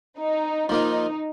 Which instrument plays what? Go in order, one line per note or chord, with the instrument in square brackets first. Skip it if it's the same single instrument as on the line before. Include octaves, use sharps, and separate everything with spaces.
[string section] D#4
[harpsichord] F3 A#3 F4 [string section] D#4